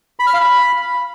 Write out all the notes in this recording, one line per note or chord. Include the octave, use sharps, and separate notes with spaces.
B5
F6
F5
B5